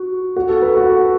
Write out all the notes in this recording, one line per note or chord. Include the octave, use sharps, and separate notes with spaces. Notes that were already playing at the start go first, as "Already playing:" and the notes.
Already playing: F#4
F#4
A4
B4
F#4